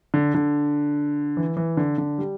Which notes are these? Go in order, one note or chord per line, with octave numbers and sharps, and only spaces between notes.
D3
D3
E3
E3
D3
D3
G3